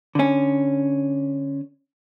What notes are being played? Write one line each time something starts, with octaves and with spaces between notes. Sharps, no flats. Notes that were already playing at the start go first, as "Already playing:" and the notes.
D3 C#4